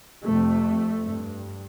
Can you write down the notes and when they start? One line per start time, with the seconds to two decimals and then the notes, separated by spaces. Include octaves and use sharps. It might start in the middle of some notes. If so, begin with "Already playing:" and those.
0.24 F2 C3 A3
1.05 G2